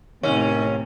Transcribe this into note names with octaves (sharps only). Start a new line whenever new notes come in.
D#2 A2 C3 C#4